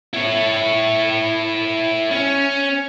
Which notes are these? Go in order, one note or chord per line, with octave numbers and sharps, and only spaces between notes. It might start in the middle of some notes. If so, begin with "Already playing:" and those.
E4 C#5
C#4